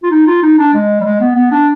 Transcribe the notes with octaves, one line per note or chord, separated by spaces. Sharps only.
F4
D#4
F4
D#4
D4
G#3
G3
G#3
B3
B3
D4